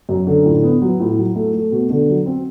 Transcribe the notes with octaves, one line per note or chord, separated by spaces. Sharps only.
F#2
D3
A2
B3
F#3
A2
F#3
A3
A3
B2
D3
F#3
C4